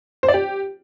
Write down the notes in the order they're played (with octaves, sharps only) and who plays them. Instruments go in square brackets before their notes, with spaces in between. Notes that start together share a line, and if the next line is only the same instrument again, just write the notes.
[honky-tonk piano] C5
D5
G4